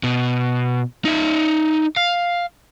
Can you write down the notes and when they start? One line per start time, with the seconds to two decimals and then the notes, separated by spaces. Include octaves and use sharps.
0.03 B2
1.05 D#4 E5
1.96 F5